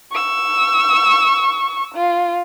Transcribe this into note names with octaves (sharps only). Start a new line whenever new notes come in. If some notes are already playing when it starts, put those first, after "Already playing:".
C#6 E6
F4